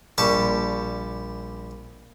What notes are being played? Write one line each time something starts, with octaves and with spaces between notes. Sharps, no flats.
A#1 G3 A5 C#6